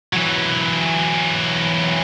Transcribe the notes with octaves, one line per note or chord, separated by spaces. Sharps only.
E3 F#3